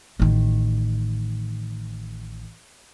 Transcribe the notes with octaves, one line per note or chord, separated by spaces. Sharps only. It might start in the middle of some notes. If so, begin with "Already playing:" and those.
A1 D#3